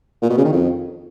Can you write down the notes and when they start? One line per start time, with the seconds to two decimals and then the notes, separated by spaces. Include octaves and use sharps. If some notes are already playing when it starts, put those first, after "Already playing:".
0.22 A#2
0.30 B2
0.37 C#3
0.45 D#3
0.52 F2